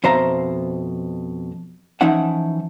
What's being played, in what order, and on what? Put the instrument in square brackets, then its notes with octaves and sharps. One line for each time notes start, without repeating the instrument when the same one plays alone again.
[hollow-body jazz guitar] F2 B2 C5 E5 F5 A#5
E3 F3 C#4 D#4 E5 F#5